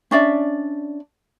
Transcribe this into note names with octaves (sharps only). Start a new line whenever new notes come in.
C#4 D4 D5 E5